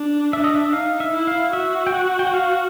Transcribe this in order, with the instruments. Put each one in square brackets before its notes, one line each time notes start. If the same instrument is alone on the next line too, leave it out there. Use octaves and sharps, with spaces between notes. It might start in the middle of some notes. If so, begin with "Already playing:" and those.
Already playing: [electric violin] D4
[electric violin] D4 [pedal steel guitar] E5
[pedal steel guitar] D#5
E5
[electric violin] D#4 [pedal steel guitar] F5
[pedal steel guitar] E5
[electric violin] E4
[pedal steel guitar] F5
[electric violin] F#4 [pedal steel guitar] E5
[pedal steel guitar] G5
F#5
G5
F#5
F5